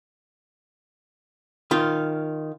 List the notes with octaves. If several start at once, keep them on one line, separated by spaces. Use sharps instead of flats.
D#3 F4